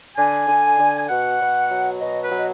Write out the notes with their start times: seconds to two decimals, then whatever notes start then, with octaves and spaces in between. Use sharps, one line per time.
0.16 D3 G#5
0.48 D3
0.78 D3
0.98 G#5
1.08 B2 F#5
1.39 B2
1.70 F#3
2.00 B2 D#5
2.23 B4
2.31 F#3
2.38 D#5